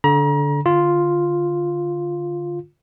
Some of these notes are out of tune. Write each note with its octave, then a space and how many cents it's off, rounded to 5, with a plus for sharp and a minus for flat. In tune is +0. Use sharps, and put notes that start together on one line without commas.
D3 -20 A#5 +35
D3 +10 F4 +0